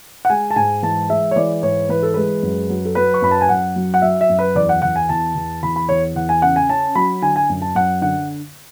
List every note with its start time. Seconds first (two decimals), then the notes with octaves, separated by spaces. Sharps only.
0.25 F#5
0.30 G#3 G#5
0.51 A5
0.56 G#2 G#5
0.83 E3 A5
1.09 G#3 E5
1.31 C#5
1.36 E3 D5
1.62 G#2 C#5
1.89 E3 B4
2.03 A4
2.14 G#3 B4
2.43 F#2
2.69 F#3
2.85 A4
2.95 F#3 B4
3.14 C#6
3.22 F#2 B5
3.31 A5
3.41 G#5
3.49 F#2 F#5
3.76 F#3
3.94 F#5
4.02 F#3 E5
4.21 E5
4.29 F#2
4.39 B4
4.55 E2 D5
4.69 F#5
4.82 E2 F#5
4.96 G#5
5.09 E2 A5
5.35 E2
5.63 E2 B5
5.76 B5
5.89 E2 C#5
6.15 E2 F#5
6.29 G#5
6.42 C#3 F#5
6.56 G#5
6.69 C#4 A5
6.95 F#3 B5
7.22 D3 G#5
7.36 G#5
7.49 F#2
7.62 A5
7.75 F#2 F#5
8.02 D3 F#5